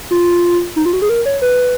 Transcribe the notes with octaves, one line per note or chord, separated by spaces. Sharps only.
F4
D#4
F4
F#4
G#4
A#4
C#5
B4